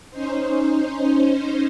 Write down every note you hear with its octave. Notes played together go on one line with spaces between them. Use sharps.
C#4 D#4 C5